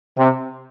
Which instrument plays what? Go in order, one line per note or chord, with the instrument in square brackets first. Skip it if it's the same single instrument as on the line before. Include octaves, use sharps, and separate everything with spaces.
[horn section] C3